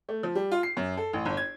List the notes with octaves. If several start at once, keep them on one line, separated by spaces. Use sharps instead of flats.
A3
F3
G3
F4
C7
F#2
A4
A1
G1
G#6